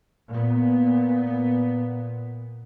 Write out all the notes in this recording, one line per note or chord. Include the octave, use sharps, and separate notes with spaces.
A#2 B3